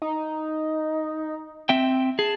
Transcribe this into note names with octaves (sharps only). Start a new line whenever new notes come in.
D#4
C4 E5 G5
G#4 A5